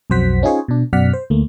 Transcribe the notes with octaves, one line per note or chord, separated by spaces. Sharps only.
B1 F2 F#3 C5 F#5 B6
C#4 D#4 F4 G#4 C5 C#5
B2 D4
F#2 B2 D5 F#5 F6 B6
C5
D2 A3 A#3